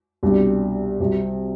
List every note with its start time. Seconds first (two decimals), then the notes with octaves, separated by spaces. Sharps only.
0.23 C2 B2 G3 D4
1.00 C2 C3 F#3 C4